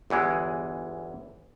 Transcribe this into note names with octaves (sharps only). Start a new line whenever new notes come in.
G1 E2 E3 G#3